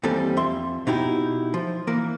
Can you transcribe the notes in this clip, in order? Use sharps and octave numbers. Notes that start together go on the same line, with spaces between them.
D#2 E3 G3 C4 A4
F2 E5 C6
B2 D#4 E4 G4
F3
E3 A#3 A#4